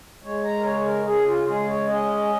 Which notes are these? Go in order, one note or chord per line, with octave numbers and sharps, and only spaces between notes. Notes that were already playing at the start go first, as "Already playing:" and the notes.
G#3 C#5
A#5
A#4
C#3 C#5
A#4
C#3 G#4
F4
G#3 G#4
C#5
C#4 D#5